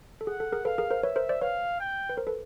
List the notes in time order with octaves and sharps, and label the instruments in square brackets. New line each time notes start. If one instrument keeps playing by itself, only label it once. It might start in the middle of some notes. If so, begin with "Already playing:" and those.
[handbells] A4
[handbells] G#4 [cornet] F#5
[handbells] A4
G#4 A#4
[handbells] A4 B4 [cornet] F5
[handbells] G#4 A#4
A#4 C5
[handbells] B4 C#5 [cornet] E5
[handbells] A#4 C5
C5 D5
[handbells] B4 C#5 [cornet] F5
[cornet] G5
[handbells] B4
A#4 C5
A4 B4